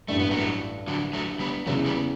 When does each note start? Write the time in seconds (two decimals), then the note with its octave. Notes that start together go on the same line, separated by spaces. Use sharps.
0.08 A1 G2 E3 G3 A3
0.19 B3
0.31 F#3 A3
0.87 D3 F#3
1.13 F#3 A3
1.40 G3 B3
1.66 E2 C#3 E3 F#3 A3
1.86 G3 B3